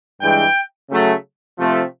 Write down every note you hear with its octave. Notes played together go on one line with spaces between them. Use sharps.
G2 E3 G#3 G5
C#3 F#3 A3
C3 F3 A3